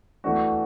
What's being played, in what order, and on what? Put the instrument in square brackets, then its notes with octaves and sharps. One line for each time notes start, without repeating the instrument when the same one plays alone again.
[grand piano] E3 A3 D4 F#4